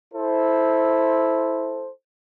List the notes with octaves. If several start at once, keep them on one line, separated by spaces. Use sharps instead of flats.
E4 A4 C5